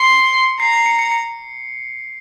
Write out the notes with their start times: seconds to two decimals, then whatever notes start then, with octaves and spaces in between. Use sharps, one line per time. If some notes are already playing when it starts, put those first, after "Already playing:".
Already playing: C6 C#7
0.60 A#5 C7
0.73 C7
0.86 C#7
0.99 C#7
1.12 C#7